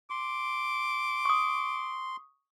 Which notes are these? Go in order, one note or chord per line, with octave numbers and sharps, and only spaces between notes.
C6 D6
C#6 D#6